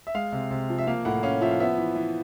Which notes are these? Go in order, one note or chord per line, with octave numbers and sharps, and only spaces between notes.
E5
G#3 F5
C3
C3
F3
E5
A#3 F5
A2 F#5
C#4 F5
F3 E5
F5
B3 E5
E3
E3